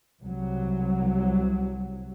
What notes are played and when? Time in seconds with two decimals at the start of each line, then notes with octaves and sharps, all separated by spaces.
0.20 C2 F#3